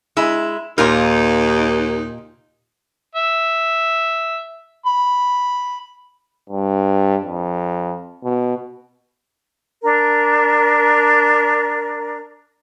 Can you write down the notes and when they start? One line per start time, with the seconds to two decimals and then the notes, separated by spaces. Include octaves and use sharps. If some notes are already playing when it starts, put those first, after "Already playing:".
0.17 G#3 E4
0.78 D#2 A#2 D#4 F4 A#4
3.15 E5
4.86 B5
6.49 G2
7.23 F2
8.24 B2
9.83 D4 A#4